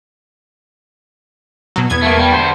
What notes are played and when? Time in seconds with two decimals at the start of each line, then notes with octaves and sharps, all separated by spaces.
1.76 B2 F#3
1.90 E2 B3 G#6
2.02 A3 A#3
2.19 G3
2.32 D3 C5